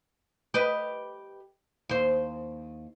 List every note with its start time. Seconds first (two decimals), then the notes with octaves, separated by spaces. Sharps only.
0.54 G4 B4 D#5
1.89 D#2 C5